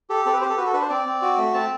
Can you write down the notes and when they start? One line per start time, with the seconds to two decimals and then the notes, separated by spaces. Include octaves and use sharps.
0.10 G4 A4
0.26 C4 A4
0.33 B4
0.41 G4 C5
0.50 A4
0.58 F#4 B4
0.66 A4
0.73 D4 B4
0.82 C5
0.89 C4 D5
1.06 C4
1.22 F#4
1.38 A3
1.54 C4 A5